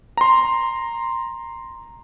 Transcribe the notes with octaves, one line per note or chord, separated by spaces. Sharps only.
A#5 C6